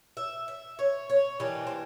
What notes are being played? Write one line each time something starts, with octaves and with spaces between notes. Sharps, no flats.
E5
E5
C#5
C#5
E3 G3 A#3 D4 D#5
C5